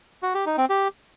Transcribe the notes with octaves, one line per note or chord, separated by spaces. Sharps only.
F#4
G4
D#4
C4
G4